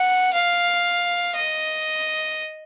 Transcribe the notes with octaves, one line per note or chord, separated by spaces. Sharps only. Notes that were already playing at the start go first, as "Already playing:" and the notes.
Already playing: F#5
F5
D#5